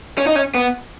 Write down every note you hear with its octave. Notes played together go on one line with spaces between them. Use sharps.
C#4
D#4
C#4
B3